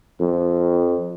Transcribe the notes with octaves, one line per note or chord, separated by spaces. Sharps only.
F2